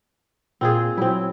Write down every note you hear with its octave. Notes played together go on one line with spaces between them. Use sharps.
A#2 C4 F4 G#4
F#3 C4 E4